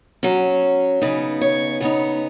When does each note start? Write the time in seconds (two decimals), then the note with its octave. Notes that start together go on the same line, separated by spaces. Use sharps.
0.23 F#3 C#4
1.02 C#3 B3 D#4
1.41 C#5
1.80 C#3 B3 D#4 C#5